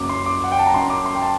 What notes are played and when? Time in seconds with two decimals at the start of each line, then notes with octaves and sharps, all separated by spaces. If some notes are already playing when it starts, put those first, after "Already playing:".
Already playing: F#1 F#2 F#3 D6
0.09 C6
0.26 D6
0.44 F#5
0.52 G5
0.59 A5
0.66 A#5
0.74 F#2 F#3 C6
0.90 D6
1.06 C6
1.15 G5
1.22 A5